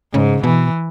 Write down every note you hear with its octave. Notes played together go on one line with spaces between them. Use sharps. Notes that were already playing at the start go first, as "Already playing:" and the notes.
G#2 C#3
B2 E3